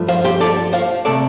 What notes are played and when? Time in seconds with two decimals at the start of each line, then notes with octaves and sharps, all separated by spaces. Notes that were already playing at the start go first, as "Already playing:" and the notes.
Already playing: G2 F3 A3
0.08 C5 F5
0.25 G4 C5
0.41 A4 D5
0.73 C5 F5
1.05 C3 A3 A4 D5